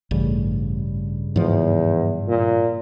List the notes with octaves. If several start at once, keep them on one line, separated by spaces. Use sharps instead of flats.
A1 G2 C#3 G3
E2 G#2 F3
A#2